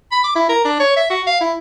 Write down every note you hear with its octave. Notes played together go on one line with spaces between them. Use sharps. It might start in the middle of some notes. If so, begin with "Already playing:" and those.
B5
D6
E4
A#4
D4
C#5
E5
F#4
F5
E4